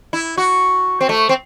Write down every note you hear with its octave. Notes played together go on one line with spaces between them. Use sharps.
E4
F#4
C4
A3
C4